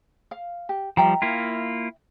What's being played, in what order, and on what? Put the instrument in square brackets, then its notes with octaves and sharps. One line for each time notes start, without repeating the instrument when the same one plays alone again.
[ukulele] F5
G4
[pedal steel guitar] F3 G3 [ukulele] E5 G5 A#5
[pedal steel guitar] A#3 E4 F4